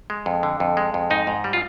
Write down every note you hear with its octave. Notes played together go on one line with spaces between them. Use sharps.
G#3
F2
D3
F2
G#3
F2
G#2 D#4
G#2
G3
F4